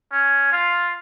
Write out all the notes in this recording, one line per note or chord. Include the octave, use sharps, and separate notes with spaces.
C#4
F4